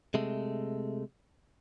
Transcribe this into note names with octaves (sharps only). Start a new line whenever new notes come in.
C3 G#3 A3